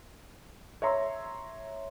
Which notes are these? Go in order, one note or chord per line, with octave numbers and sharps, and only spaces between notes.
C#5 E5 A#5 C6 E6